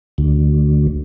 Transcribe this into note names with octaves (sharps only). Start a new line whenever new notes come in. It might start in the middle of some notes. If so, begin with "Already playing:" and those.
D2